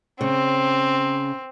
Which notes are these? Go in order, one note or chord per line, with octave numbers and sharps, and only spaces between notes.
C#3 C4